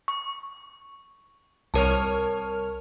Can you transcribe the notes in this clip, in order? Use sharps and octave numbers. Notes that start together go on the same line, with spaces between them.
C#6
C2 A#4 C#5 A5 F6